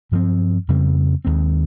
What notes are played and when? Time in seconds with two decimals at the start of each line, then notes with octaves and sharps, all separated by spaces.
0.12 G2 F3 C4
0.68 F2 C#3 G3 C4
1.25 D#2 D#3 G#3 C4